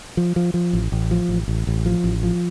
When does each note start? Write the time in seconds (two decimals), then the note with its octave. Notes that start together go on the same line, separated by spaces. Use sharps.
0.17 F3
0.36 F3
0.54 F3
0.73 A1
0.92 A1
1.11 F3
1.29 A1
1.48 A1
1.67 A1
1.86 F3
2.04 A1
2.23 F3